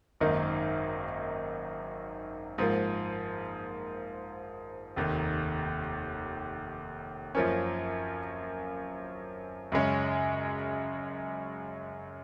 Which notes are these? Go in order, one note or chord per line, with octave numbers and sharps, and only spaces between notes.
G#1 F#2 D#3 A#3 D#4
G#2 F3 A#3
F1 D#2 D#3
F#2 F3 A#3 C#4
F#2 C#3 G#3 C#4